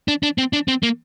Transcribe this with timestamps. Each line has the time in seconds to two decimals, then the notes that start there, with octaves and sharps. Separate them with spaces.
0.08 D4
0.23 D4
0.38 C4
0.53 D4
0.68 C4
0.83 A#3